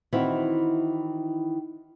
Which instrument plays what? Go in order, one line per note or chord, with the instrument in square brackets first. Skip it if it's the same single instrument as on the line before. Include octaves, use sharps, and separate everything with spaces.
[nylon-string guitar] D#3 E3 C4 E4 F#4